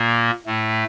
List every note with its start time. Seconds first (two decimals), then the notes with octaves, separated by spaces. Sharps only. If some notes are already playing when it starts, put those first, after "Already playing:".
Already playing: A#2 A#3
0.46 A2 A3